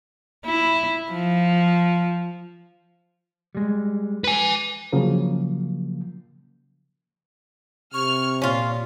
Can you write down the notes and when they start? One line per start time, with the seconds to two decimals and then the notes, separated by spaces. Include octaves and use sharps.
0.45 E4
1.12 F3
3.55 G3 G#3
4.24 B4 G#5
4.92 C#3 F3 F#3 A#3
7.94 C3 C#6 F6
8.42 A#2 C#4 F4